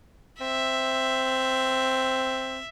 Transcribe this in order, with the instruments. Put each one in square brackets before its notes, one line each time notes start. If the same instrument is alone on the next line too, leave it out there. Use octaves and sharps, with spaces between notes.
[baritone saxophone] C4 [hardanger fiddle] E5